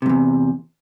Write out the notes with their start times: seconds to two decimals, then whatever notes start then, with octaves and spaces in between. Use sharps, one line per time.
0.02 C3
0.06 G2
0.09 E2